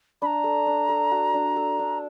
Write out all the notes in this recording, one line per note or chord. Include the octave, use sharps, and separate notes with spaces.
D4 A#5 B5
A4
D4
A4
F#4
D4
A4
D4